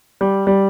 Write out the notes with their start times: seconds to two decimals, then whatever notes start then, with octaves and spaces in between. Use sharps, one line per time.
0.21 G3
0.47 G3